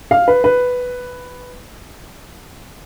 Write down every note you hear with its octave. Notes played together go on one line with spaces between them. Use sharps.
F5
B4
B4